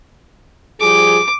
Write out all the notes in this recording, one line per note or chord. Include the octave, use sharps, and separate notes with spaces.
F3 G3 G#4 D6